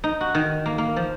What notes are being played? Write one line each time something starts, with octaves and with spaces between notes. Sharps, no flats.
D#4
F#4
D#3
A#3
A#3
F3